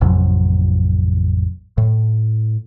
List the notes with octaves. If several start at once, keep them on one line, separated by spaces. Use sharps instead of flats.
A1 F2 C3 F#3
A2